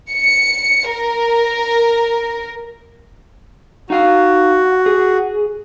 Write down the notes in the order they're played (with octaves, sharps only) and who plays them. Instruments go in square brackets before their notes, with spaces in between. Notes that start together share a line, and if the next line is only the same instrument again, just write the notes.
[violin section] C#7
A#4
[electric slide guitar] D#4 F5 [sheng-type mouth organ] F#4
[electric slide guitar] G#4